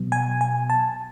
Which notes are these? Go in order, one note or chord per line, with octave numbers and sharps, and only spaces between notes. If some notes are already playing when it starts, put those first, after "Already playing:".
Already playing: B2 F#3 B3
G#5
G#5
A5